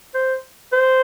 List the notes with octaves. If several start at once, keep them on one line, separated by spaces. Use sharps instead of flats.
C5
C5